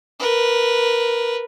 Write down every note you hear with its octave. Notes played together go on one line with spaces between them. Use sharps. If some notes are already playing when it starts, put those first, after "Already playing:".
A#4 B4